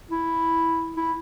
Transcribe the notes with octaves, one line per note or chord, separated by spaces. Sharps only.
E4
E4